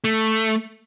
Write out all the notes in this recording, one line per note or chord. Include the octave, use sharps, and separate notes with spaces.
A3